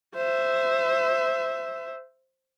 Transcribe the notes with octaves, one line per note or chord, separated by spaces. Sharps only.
C5 E5